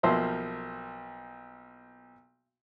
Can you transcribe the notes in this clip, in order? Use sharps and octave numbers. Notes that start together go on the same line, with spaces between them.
B1 F3 A#3 C5 E5